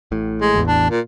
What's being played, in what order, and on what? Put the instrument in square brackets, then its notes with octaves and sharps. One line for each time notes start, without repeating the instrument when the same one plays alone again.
[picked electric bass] A1 A2
[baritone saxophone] G#3
[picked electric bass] A1 E2
[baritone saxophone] D4
A#2